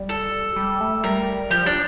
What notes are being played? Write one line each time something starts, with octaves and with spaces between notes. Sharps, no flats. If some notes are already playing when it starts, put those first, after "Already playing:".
Already playing: G3
A4
G3
A3
G3 A#4
F3 G4
D4